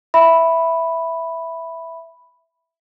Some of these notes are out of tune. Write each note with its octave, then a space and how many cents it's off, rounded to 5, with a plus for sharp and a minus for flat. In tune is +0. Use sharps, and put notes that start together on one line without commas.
E5 +0 B5 +0